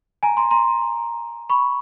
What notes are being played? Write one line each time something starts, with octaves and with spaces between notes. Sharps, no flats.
G#5 A#5
A#5 C6
A#5 C6
B5 C#6